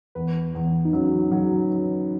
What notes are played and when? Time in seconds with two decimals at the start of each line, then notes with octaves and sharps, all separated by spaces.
0.15 E2 B4
0.55 E2
0.85 D#4
0.93 F#3 C#4
1.31 F#3